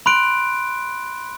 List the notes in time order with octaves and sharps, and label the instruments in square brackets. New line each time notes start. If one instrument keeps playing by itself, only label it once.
[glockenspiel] B5 C6 F#6 D7